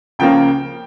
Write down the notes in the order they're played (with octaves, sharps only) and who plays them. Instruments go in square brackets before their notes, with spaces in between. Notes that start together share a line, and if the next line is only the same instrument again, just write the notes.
[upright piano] C#2 C#3 F3 A#3 C#4 G5